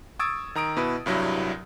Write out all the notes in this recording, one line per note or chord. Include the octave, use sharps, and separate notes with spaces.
C#6 D#6 E6 G#6 A6 D7
D#3 A#5 D#6 D7
B2 E4 B4
C2 G2 F#3 E4